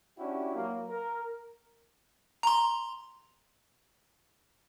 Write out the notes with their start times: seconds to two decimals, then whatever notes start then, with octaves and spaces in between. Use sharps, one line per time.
0.18 C#4 D4 E4 F#4 G4
0.55 F#3 A#3
0.89 A#4
2.43 A#5 C6